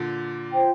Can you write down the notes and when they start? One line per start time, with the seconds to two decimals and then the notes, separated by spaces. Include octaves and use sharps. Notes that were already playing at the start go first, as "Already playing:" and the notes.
Already playing: A#2 D3
0.52 F4 C5 G5